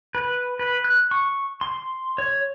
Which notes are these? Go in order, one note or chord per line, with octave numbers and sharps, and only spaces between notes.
B4
B4
F#6
C#6
C6
C#5